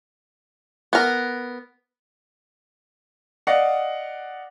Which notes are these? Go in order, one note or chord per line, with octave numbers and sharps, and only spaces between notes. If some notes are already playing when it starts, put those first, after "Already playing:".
B3 A#4
D5 D#5 F5 F#5